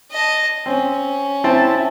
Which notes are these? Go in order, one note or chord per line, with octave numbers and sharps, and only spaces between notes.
D#5 A5
C4 C#4
C4 E4 A5